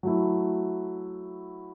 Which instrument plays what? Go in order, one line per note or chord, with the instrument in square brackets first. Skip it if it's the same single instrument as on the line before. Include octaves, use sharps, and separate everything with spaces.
[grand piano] F#3 A3 E4